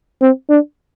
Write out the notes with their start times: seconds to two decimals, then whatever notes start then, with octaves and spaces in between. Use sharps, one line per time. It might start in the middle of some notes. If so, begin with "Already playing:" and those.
0.21 C4
0.50 D4